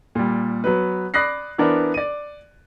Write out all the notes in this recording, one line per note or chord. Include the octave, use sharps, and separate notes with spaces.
A#2 G3
F#3 B3 B4
D5 B5 D#6 F#6 A#6 C7
E3 B3 D4 A#4 C5 D5
D5 D#7